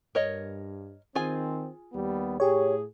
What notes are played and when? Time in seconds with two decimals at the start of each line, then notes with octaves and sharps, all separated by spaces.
0.15 G2 A#4 C#5 D#5
1.15 D#3 C4 F4 G#4 G#5
1.93 D#2 G3 B3
2.40 A2 G4 G#4 C#5